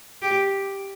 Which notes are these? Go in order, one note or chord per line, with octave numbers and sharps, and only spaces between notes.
G4